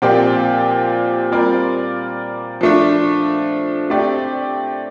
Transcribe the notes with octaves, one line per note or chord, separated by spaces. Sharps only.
A#2 F3 C4 G4 D5
G3 C4 F4 A#4 D5
F3 A3 D4
A3 C4 G4 D5